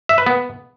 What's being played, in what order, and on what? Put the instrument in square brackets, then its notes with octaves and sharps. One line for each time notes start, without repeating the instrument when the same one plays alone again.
[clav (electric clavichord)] E5
B4
B3